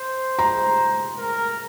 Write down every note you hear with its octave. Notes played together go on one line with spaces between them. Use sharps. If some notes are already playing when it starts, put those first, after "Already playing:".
Already playing: C5
A#5
A#4